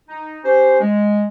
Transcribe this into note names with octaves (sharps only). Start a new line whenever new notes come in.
D#4
C#4 G4 C5
G#3